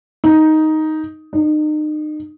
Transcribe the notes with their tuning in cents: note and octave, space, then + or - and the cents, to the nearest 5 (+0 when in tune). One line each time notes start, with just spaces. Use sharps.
D#4 +5
D#4 -35